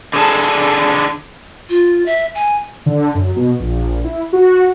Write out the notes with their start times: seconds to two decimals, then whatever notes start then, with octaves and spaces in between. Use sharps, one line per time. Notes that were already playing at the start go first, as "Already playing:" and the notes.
0.13 D3 G#4 A5
1.69 F4
2.06 E5
2.35 G#5
2.86 D3
3.15 F#2
3.36 B2
3.60 A#1
4.04 E4
4.33 F#4